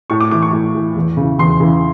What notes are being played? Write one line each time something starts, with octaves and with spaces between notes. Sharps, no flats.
A2 C#6
D6
E3 D6
C#6
A2
E3
E2
C#3 E3
E2 C6
C#3 E3